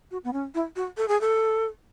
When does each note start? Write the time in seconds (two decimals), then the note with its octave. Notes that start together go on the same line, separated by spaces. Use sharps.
0.11 F#4
0.24 B3
0.33 C#4
0.54 E4
0.76 F#4
0.97 A4
1.08 G#4
1.21 A4